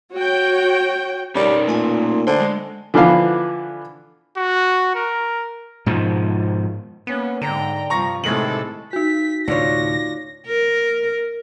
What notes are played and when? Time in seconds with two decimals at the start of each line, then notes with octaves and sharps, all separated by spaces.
0.12 F#4 C#5 G5
1.35 G3 C#4 D#4 A#4 C#5 D5
1.68 A#2 A3 G#5
2.27 D3 C5 G#5
2.40 G#3
2.94 D3 E3 F3 B3 F5
4.37 F#4
4.95 A#4
5.86 G#2 B2 D#3 F3
7.07 A#3 B3 C#4
7.42 G#2 D3 G5 A#5
7.90 G2 C3 F3 A#5 C#6 A#6
8.24 A2 C3 D#3 G#3 A3 A4 F#7
8.93 D#4 F#4 B6
9.48 D2 A2 C3 D4 F4 C#5 A#6
10.47 A#4